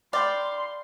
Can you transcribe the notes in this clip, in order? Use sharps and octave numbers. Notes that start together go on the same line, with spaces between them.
D5 F5 G5 B5 C6